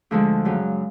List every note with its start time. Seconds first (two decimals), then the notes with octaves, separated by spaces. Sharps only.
0.11 D2 D3 F3 G#3
0.45 F#2 C#3 F#3